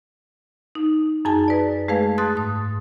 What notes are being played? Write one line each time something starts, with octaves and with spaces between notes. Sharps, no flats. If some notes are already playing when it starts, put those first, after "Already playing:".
D#4
F#2 D#4 G#4 G#5 A5 A6
B4 D5
G#3 A3 G#4 B4 F5 G#6
A5 C6 D#6 F#6 A6
G#2 D#6